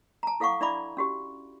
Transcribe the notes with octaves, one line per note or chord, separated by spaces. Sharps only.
A5 A#5
E4 A4 F5 F#5 C#6 D6
D4 E4 D5 E5 B5 D6
C#4 F#4 G4